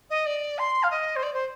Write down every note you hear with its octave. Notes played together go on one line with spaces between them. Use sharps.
D#5
D5
C6
F5
D#5
C5
D5
C5